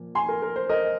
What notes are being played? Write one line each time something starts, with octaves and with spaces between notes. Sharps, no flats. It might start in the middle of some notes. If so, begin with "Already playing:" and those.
Already playing: A#2 F3
G#5 C6
A#4
A#4
C5
A#4 D#5